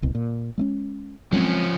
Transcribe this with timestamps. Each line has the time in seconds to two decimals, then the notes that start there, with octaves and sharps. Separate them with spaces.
0.02 D1 C2 B2
0.15 A#2
0.58 G#3 A3 C#4
1.33 F3 F#3 G#3 C4 C#4